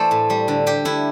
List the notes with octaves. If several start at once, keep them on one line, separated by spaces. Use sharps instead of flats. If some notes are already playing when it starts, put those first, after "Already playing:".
Already playing: E3 A3 A4 C5 D5
A2
G3
D3
G3 G4
D3 E4